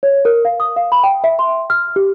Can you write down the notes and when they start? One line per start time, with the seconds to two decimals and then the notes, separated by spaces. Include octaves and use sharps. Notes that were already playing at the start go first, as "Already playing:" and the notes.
0.03 C#5
0.25 A#4
0.45 F5
0.60 D#6
0.76 F5
0.92 B5
1.04 G5
1.24 E5
1.39 C6
1.70 F6
1.96 G4